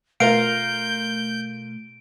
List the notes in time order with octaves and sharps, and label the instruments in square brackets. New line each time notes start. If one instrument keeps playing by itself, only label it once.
[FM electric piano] B2 A3 [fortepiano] F4 A#4 F5 [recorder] G6 [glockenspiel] D7